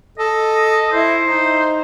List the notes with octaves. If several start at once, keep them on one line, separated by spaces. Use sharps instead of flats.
A4 D#5
E4 C5
D#4